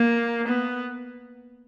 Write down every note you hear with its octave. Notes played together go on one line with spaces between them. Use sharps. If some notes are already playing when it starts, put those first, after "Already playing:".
Already playing: A#3
B3